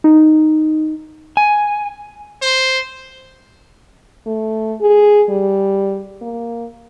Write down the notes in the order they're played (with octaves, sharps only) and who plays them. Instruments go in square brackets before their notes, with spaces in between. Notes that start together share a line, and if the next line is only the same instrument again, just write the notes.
[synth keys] D#4
[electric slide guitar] G#5
[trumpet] C5
[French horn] A3
G#4
G3
A#3